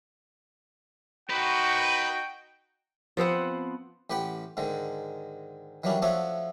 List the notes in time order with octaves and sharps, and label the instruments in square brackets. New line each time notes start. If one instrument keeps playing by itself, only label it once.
[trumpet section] D#4 F#4 [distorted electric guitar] B4 C5 [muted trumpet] G5
[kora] F3 B3 C4 F#5
[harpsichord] A1 G4 B4 F#5 G5
G#2 D3 D#3 G#3
D#3 E3 F#3 G3 C#4 D4
F3 A3 D4 F#4 C#5 E5